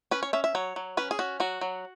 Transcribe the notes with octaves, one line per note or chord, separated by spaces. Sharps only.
C#4 B4
C#5
C#4 E5
E5
F#3 C#5
F#3
C#4 B4
G#4
C#4 F#4
F#3 F#4
F#3